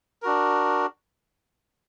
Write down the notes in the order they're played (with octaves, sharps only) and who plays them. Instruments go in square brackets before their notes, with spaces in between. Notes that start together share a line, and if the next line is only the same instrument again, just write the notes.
[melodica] D4 F#4 A#4